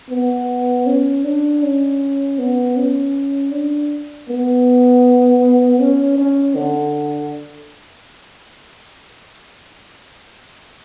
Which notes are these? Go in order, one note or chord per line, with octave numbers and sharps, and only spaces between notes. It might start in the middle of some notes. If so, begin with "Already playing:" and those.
B3
C#4
D4
C#4
B3
C#4
D4
B3
C#4
C#4
D3